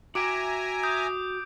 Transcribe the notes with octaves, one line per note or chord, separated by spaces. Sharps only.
F#4 E5 G5 G#5 A#5 D6 D7
D#6 G6